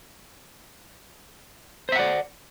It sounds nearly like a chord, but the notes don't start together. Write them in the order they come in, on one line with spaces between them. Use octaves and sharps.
C5 E5 F#5 D5